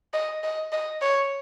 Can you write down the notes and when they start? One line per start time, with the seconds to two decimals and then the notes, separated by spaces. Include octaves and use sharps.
0.13 D#5
0.43 D#5
0.72 D#5
1.01 C#5